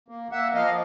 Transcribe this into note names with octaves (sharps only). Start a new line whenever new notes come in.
A#3
A#3 E5 F#5
F3 D#5 F5